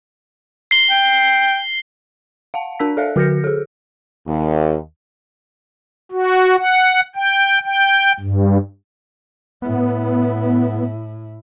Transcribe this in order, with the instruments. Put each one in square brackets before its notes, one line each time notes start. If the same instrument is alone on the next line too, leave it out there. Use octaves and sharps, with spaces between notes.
[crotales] C7 G7
[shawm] G5
[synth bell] F5 F#5 A5
D4 A#4 A5 E6 B6
A4 D5 E5 F5 F#6
D3 F#4 F6 G6 A#6 C#7
G#4 A4
[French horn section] D#2
[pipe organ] F#4
F#5
G5
G5
G2
[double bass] A2 E4 [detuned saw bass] B3